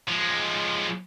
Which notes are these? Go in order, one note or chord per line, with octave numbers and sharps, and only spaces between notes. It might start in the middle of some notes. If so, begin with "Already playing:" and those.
F3 G#3